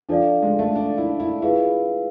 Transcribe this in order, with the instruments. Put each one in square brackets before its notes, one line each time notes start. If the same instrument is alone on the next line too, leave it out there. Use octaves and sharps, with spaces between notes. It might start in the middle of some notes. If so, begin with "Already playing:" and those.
[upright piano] F3 [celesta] D4 A4 D5 F5
[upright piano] G#3
A3
D4
E4
E4
[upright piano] E4 [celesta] F4 G#4 B4 F5